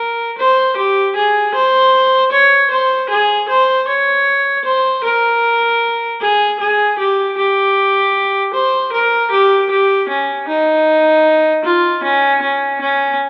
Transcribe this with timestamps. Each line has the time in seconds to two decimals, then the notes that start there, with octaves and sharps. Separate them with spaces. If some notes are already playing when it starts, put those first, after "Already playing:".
Already playing: A#4
0.38 C5
0.76 G4
1.15 G#4
1.54 C5
2.31 C#5
2.70 C5
3.09 G#4
3.48 C5
3.87 C#5
4.64 C5
5.03 A#4
6.20 G#4
6.59 G#4
6.98 G4
7.37 G4
8.53 C5
8.92 A#4
9.31 G4
9.70 G4
10.08 C#4
10.48 D#4
11.64 F4
12.03 C#4
12.41 C#4
12.80 C#4